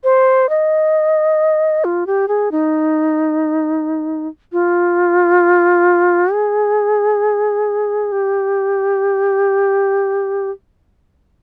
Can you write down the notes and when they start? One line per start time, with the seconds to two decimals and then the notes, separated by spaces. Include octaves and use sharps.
0.04 C5
0.49 D#5
1.84 F4
2.07 G4
2.28 G#4
2.52 D#4
4.52 F4
6.32 G#4
8.12 G4